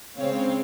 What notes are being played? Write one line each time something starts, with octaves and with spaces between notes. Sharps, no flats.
C#3 G#3 C4 C#5 F5